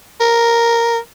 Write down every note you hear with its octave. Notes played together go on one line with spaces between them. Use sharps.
A#4